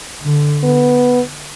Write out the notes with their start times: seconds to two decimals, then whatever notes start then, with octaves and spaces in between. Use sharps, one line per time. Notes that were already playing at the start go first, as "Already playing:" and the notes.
0.23 D3
0.64 B3